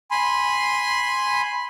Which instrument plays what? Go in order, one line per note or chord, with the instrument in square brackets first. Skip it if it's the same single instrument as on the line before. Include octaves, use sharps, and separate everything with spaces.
[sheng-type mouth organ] G#5 B5 C6